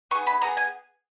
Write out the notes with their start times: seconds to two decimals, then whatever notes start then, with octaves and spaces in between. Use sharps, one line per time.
0.11 B3 D#4 G#4 C#6
0.27 B5
0.42 B3 D#4 G#4 A#5
0.57 G#5